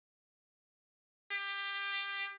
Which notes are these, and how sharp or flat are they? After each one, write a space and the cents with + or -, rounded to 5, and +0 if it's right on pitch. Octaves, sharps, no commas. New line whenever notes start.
G4 +20